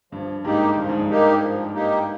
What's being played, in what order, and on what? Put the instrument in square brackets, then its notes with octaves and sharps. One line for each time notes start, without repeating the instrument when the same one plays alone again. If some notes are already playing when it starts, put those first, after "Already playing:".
[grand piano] G2 [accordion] F3
[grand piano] G#2 [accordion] A#3 D#4 G4
[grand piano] G2 [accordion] F3
[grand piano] G#2
G2
[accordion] A#3 D#4 G4
F3
A#3 D#4 G4